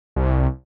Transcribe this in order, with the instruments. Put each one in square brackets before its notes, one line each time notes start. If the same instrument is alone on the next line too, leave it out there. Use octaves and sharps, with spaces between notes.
[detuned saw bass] C2